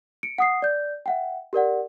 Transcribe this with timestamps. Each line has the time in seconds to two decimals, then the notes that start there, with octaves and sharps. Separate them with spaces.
0.23 C#7 D7
0.38 F#5 D#6 C7
0.62 D5 G6
1.06 E5 F#5 G5
1.53 G4 A#4 D5 F#5